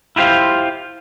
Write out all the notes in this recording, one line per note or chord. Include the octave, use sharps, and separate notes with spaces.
E4 F4 G4 C5 F5